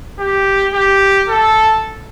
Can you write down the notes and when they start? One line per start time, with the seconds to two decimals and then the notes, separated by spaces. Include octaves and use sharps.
0.19 G4
0.74 G4
1.29 A4